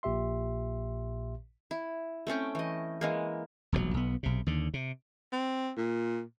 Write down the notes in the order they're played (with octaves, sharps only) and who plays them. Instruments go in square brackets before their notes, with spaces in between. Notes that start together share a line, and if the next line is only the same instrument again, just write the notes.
[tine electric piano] A#1 A#2 G4 E5 C6
[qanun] E4
A3 C4 C#4 G5
E3 D#5
E3 G#3 A#3
[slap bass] E1 A#1 G#2 F#3
B1 B3
B1 C3
D#2 D3
C3
[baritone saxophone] C4
A#2